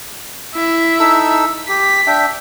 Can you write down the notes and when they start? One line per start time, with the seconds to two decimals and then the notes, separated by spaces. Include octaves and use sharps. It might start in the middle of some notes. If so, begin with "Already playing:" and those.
0.54 E4 E5
0.99 D#4 A4 E6
1.69 G4 B6
2.07 D4 E5 G5